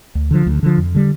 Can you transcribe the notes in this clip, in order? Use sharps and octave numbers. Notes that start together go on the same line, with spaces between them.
D2
D3 F3
D2
D3 F3
F2
D3 G3